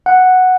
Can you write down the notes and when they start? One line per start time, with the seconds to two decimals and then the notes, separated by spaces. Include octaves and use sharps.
0.06 F#5